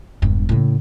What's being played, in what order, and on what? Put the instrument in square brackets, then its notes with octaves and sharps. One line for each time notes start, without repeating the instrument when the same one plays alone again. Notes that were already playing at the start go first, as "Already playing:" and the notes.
[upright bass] E1 G2
A2 C#3